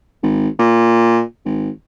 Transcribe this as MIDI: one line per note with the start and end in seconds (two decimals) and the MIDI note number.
0.23 0.48 32
0.59 1.21 46
1.45 1.69 32